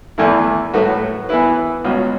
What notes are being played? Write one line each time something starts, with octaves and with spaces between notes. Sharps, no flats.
E2 E3 A3 E4
A2 F#3 A3 F#4 B4
E3 B3 E4 B4
C#2 B2 F#3 C#4